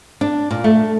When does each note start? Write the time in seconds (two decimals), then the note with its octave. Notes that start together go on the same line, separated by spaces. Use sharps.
0.21 D4
0.51 A#2
0.64 A3